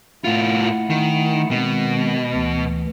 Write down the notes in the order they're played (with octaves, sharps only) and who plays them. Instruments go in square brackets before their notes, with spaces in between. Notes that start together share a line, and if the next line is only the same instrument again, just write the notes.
[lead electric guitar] A2 F4 [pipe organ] A3 E4 F#5
[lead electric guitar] D#3
[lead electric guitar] B2 [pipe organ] D#3 G#3 C4
[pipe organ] D2 E3